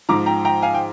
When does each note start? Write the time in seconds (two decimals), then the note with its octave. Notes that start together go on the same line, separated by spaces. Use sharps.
0.09 G#2 F3 A#5 D6
0.26 G5 A#5
0.45 G5 A#5
0.62 F5 G#5
0.74 G5